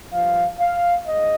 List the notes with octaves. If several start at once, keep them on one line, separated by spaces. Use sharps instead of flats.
G2 F3 F5
F5
G#2 D#5